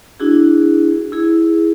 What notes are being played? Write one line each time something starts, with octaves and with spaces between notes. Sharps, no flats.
D4 E4 F#4 G#4
E4 G#4